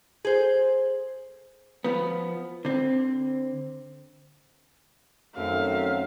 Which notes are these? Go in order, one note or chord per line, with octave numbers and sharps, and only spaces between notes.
G#4 C5
F3 B3
D3 C4
F#2 D#3 F#3 A3 C4 A#4 E5 F5